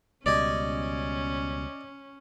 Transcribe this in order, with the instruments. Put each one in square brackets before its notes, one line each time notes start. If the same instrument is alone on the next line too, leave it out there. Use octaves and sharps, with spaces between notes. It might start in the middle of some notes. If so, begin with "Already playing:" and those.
[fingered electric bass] C#2 B2 G3 [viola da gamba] C#4 [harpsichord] D5 D#5 G#5